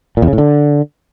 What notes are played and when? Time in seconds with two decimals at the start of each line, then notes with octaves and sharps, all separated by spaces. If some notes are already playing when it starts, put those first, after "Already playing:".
0.17 A#2
0.22 E2
0.28 C#3
0.33 A2
0.38 D3